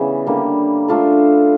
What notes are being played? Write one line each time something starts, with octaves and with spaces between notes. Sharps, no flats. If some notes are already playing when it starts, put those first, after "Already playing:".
Already playing: C#3 E3 G3 B3
D3 G3 A#3
A3 D4 F4 A4